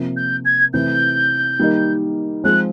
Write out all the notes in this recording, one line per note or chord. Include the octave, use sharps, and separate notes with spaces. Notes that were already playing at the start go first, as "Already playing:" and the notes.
Already playing: C3 F3 A#3
G6
G#6
C3 E3 A3 C4 G6
D#3 G3 A#3 D#4
F3 G#3 C4 F#6